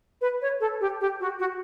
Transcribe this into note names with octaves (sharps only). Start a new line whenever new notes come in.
B4
C#5
A4
G4
G4
F#4
F#4